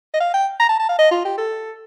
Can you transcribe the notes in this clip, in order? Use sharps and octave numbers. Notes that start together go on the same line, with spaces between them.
D#5
F5
G5
A#5
A5
A5
F5
D#5
F4
G4
A4